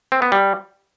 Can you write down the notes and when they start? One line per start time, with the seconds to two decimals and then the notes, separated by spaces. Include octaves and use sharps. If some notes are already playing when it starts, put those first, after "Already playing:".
0.12 C4
0.22 B3
0.32 G3